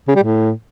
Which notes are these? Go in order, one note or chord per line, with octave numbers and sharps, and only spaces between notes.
C#3
G3
A2